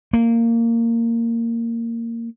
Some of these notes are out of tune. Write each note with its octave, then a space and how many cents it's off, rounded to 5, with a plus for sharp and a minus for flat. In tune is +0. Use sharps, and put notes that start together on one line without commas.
A#3 -15